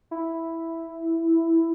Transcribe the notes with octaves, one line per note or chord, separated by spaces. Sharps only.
E4